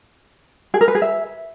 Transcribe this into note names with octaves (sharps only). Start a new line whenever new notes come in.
G#4
A#4
B4
G#4
E5